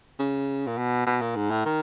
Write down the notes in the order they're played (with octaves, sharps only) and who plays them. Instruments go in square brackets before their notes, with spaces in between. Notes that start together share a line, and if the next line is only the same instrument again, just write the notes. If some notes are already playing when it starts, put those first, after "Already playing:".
[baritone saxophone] C#3
A#2
B2
B2
A#2
G#2
A2
D#3